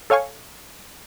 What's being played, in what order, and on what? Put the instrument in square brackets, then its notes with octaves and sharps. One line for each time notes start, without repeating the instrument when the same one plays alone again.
[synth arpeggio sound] A4 C#5 F5 G#5 C#6